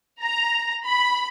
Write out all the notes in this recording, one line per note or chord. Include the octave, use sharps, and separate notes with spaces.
A#5
B5